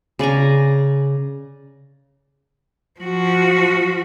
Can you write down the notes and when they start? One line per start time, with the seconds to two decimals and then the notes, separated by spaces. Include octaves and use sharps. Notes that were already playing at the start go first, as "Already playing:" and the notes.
0.19 C#3 D5 G#5 A#5
3.00 F3 F#4